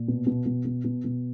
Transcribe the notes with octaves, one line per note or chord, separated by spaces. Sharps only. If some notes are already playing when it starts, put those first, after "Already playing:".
Already playing: A#2
B2
B2
B2
B2
B2
B2